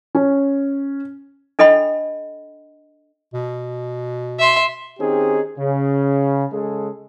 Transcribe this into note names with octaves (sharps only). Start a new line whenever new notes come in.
C#4
D4 A4 D#5 G5 B5
B2
E5 C6
D#3 C4 C#4 D#4 G4 G#4
C#3
C#3 G#3 G#4 A4